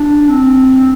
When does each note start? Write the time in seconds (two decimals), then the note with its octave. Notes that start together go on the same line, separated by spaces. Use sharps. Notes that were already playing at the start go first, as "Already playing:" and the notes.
Already playing: D4
0.29 C4